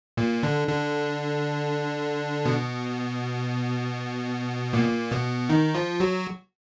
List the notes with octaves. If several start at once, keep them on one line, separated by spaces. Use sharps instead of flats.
A#2 A#3
D3 D4
D3 D4
B2 B3
A#2 A#3
B2 B3
D#3 D#4
F3 F4
F#3 F#4